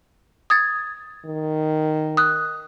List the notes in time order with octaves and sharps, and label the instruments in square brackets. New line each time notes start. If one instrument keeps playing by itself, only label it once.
[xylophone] D#6 G#6 A6
[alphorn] D#3
[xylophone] D#6 F#6